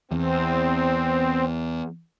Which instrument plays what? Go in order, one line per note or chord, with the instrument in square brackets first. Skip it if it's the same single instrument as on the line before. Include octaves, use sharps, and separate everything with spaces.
[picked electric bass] E2 [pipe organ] C4